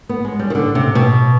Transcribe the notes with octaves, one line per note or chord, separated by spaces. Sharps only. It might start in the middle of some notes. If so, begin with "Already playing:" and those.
B3
G#3
G3
D#3
D3
C3
B2